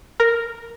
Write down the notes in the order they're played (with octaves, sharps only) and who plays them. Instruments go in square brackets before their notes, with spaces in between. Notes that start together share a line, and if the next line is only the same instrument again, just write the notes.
[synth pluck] A#4